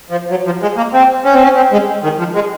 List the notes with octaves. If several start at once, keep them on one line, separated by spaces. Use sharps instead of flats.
F3
F#3
F3
G#3
A#3
C4
C#4
C4
C#4
C4
G#3
D#3
F3
G#3